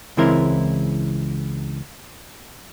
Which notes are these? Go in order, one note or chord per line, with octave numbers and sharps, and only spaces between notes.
C#2 E3 G#3 C4 E4 A#4